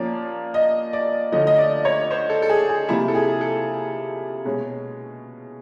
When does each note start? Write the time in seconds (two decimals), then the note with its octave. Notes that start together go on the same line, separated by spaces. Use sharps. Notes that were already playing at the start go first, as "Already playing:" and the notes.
Already playing: A#2 F3 A#3 C#4 D5
0.54 D#5
0.93 D5
1.32 D3 F3 A3 C#4 D#5
1.47 D#5
1.58 D5
1.85 C#5
2.11 C5
2.30 A4
2.42 A4
2.49 G#4
2.69 G#4
2.89 C3 F3 A#3 E4
3.08 A4
3.15 G#4
3.41 A4
4.45 B2 G#3 C#4